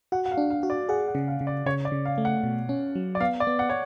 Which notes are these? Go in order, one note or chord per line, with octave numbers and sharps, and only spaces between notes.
F#4 F#5
F#5
F5
D4
F5
F#4
D5
G#4 F#5
F#5
C#3
F5
C#3
D5
C#3 C#5
D5
C#3
F5
A3
F#5
B2
C#4
F#3
D5
B3 F5
D5
B3
F#5
C#5